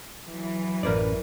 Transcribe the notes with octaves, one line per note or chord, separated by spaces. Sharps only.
E3 F#3
A1 F#2 A#4 B4 D5